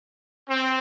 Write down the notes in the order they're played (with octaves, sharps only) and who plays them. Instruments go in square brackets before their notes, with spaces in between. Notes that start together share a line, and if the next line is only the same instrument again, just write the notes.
[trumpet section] C4